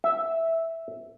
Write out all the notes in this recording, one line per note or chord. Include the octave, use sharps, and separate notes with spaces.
E5